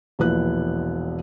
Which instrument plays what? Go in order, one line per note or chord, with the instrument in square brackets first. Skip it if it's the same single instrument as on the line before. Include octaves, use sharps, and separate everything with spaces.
[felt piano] E1 A#1 E4 B4 F#6